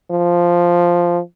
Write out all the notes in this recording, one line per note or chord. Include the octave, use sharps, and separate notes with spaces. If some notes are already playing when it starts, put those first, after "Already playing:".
F3